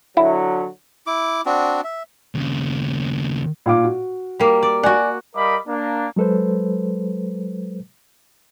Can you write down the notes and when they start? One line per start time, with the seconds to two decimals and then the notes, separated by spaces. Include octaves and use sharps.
0.17 D3 F#3 E4
1.07 E4 D6
1.46 C4 D4 F#4
1.84 E5
2.35 D#2 C#3
3.66 A#2 F5 D6
3.84 F#4
4.40 G3 A#3
4.63 D5
4.83 F#4 D5 F#5 G#5
5.35 G3 A#4 D#5 F5 B5 D6
5.68 A#3 D4
6.16 F#3 G#3 A4 B4 C5